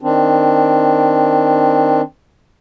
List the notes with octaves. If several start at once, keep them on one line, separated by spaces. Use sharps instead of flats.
D#3 C4 D4